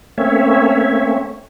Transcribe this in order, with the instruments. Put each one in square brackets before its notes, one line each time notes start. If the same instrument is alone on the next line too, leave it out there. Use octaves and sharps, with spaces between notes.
[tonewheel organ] A3 A#3 C4 C#4 C#5 E5